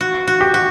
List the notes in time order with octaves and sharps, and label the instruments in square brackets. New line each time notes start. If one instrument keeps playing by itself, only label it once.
[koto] F#4
F#4
[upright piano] G4
[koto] F#4